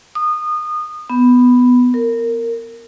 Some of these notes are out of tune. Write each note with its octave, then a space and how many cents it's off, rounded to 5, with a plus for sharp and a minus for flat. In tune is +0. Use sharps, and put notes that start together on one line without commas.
D#6 -25
B3 +5
A#4 -20